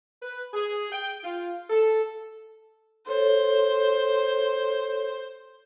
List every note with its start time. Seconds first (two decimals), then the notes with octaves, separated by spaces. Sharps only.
0.23 B4
0.54 G#4
0.92 G5
1.24 F4
1.70 A4
3.07 A4 C5 C#5